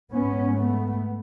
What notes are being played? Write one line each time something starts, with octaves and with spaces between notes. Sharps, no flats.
G#2 B3 C#4
A3 B3